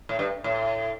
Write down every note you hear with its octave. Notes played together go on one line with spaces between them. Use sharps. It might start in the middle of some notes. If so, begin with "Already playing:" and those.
A2
G2
A2